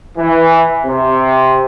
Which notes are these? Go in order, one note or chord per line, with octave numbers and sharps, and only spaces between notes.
E3
C3